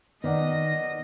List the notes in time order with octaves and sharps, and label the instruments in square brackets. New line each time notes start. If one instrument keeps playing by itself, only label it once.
[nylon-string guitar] D#3 [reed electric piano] B3 D5 F#5 [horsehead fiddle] D#5